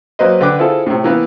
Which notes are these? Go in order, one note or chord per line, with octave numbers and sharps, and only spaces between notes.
F#3 A#3 C4 B4 C5 D#5
D3 B4 G5 D6
C4 E4 F4 G#4 A4
A2 C3
E3 A#3 B3